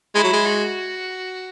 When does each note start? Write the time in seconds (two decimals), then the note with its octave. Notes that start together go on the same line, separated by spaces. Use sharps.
0.14 G#3 E4
0.24 F#3
0.33 G#3
0.45 F#4